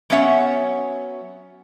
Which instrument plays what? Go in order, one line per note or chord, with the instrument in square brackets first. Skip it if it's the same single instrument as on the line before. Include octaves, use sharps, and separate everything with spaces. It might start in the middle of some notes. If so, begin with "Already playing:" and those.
[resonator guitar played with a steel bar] F#3 B3 C#4 C#5 E5 F#5